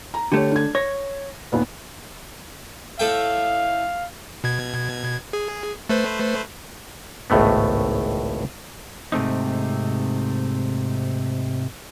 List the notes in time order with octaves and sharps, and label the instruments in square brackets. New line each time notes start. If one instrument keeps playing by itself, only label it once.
[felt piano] A#5
[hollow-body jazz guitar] D3 A3 [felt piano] G4 C#5
[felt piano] D4 G#6
[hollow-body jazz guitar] C#5 [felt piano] A#6
[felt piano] D#2 A#2 B3
[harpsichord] A2 A3 G5 [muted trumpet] F5
[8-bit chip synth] B2 G#6
G#4
A3 B4 C5
[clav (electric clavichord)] G#1 C#2 A2 A3 B3
[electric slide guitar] G#2 C3 A3 C4 D#4